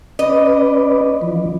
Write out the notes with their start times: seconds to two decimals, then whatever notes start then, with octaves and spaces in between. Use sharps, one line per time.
0.19 C#4 B4 D5 D#5
1.21 E3 F3